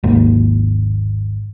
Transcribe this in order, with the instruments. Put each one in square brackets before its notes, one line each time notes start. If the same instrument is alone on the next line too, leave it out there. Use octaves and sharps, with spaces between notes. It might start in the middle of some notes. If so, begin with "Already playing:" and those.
[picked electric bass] G#1 D#2